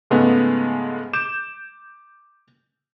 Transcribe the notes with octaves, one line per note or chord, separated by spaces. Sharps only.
G#2 C#3 G#3 A3 B3
D6 G6 E7